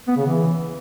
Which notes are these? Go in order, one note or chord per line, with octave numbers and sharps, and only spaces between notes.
B3
C#3
E3